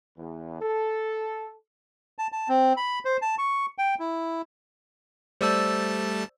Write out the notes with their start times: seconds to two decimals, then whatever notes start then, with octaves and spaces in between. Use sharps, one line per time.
0.17 E2
0.61 A4
2.18 A5
2.32 A5
2.48 C4
2.77 B5
3.05 C5
3.22 A5
3.38 C#6
3.78 G5
3.99 E4
5.41 G3 A3 C5 D5 A5 E6